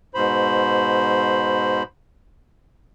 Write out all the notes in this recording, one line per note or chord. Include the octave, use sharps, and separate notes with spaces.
G#2 B2 C5 B5